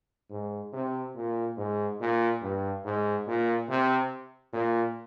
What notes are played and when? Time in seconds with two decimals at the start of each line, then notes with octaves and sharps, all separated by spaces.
0.30 G#2
0.73 C3
1.16 A#2
1.57 G#2
2.00 A#2
2.42 G2
2.85 G#2
3.27 A#2
3.69 C3
4.53 A#2